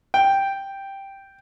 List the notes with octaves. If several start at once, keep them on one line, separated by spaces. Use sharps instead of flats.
G5